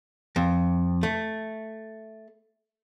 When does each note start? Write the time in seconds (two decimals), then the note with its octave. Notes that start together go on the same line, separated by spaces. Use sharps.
0.36 F2
1.03 A3